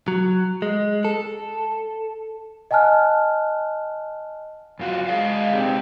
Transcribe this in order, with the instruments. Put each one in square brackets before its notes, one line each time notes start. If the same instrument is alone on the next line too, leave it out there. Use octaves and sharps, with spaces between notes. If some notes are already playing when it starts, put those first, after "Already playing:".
[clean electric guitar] F#3
G#3
A4
[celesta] D#5 F#5 G#5 A5 F6 F#6
[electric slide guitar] F#2 F4 F#4
[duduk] G#3 [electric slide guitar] G#4 D5 F5
[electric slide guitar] G#3 D#4 G4 [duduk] C4